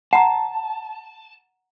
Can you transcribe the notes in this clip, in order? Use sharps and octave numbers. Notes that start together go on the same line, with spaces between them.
F#5 A5 A#5